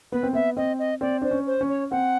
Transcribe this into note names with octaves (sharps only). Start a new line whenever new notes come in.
B3 B4
C4
B3 E5
C4 D#5
D#5
C4 D5
D4 C5
C#4
C5
C#4
C#5
C4 F#5